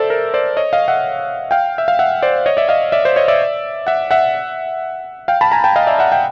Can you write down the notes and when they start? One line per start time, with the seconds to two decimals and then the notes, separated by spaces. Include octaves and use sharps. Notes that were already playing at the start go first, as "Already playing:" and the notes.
Already playing: A4 C5 D5 E5
0.10 A#4
0.34 C5 D5
0.57 C#5 D#5
0.73 D#5 F5
0.88 E5 F#5
1.51 F5 G5
1.78 E5
1.88 F5
1.99 E5 F#5
2.22 C5 D5
2.46 C#5 D#5
2.57 D5 E5
2.69 D#5 F5
2.92 D5 E5
3.05 C5 D5
3.16 C#5 D#5
3.28 D5 E5
3.87 E5 F#5
4.11 E5 F#5
5.28 F5 G5
5.41 A5 B5
5.52 G#5 A#5
5.64 G5 A5
5.76 D#5 F5
5.87 D5 E5
5.99 E5 F#5
6.12 F5 G5